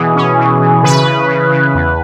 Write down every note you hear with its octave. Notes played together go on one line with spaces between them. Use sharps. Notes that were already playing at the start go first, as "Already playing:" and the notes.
Already playing: B2 E3 G#4
C#4
E3
E3
C#3 B4
C#3
C#3
C#3
E2